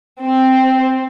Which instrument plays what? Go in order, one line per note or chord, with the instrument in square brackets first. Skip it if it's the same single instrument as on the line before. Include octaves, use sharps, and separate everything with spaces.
[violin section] C4